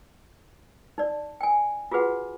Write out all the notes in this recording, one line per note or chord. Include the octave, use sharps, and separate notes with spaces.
D#4 D5
G5 G#5
F4 F#4 G#4 B4 F#5